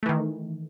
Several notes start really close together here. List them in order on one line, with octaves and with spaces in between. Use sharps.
A3 E3 D#3